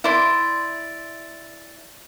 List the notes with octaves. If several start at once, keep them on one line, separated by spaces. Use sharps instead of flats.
E4 D5 C6